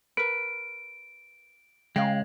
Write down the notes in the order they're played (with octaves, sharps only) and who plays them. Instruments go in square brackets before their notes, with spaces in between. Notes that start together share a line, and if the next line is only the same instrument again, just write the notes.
[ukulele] A#4 B4 [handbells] D7
[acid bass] C#3 [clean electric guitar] G#3 [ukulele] F5 G5